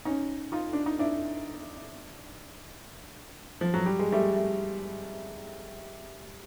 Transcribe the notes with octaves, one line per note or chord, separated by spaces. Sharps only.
C#4 D#4
D#4 F4
D4
D#4
D4 E4
F3
F#3
G3
G#3
G3 A3
A3